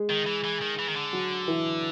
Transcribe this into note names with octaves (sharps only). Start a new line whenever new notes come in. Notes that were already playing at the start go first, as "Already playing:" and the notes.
Already playing: G#3 G#4
D#3
E3
E3
D#3
E3
D#3
D3
F#3 F#4
E3 E4